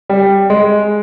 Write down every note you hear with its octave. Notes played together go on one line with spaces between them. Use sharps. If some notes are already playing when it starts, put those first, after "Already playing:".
G3
G#3